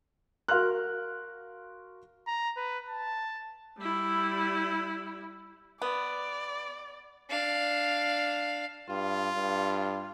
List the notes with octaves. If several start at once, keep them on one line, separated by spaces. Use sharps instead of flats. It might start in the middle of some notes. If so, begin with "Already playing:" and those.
F#4 A#4 F5 C6 F6 F#6
A#5
B4
A5
G3 E4
B3 D5
D4 F5
G2 F4
G2